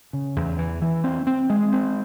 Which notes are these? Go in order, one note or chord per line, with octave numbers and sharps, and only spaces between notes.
C#3
E2
E3
E3
C4
C4
G#3
C4